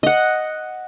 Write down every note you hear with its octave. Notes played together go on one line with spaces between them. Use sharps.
D#5 F#5